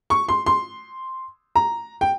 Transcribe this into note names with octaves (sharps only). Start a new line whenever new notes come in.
C#6
C6
C6
A#5
G5